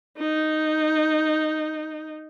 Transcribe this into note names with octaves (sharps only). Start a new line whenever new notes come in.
D#4